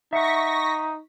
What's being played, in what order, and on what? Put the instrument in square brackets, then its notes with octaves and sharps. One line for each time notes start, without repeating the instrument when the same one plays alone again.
[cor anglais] D#4 [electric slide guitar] E5 F#5 [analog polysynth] C#6 A#6 B6